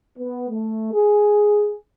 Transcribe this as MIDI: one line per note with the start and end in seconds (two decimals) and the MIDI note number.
0.18 0.46 59
0.49 0.92 57
0.94 1.76 68